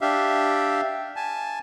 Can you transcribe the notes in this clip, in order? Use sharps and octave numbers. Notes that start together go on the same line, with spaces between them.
D4 G4 E5 F5
G#5 A5